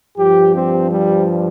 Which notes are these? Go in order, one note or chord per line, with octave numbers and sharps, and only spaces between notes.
G2 F3 G4
C4
G3